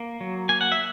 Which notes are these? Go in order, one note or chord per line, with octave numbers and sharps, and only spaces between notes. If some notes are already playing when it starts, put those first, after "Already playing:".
Already playing: A#3
F#3
A#3 G#5
F#5
E5